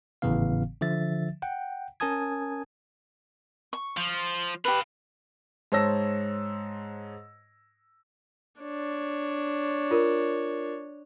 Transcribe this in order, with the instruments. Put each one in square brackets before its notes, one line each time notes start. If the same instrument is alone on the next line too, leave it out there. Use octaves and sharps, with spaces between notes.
[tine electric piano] G#1 A2 C#3 E3 B3 F5
D3 F3 E5 A6
F#5 G5
C#4 A#4 G#5 A5 D#6 G#6
[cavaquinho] C#6
[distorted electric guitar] F3
[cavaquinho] G4 B4 [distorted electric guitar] F5 B5
[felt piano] G#2 C5 C#5 A5 E6 A#6
[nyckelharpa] D4 C#5
[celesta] F4 A#4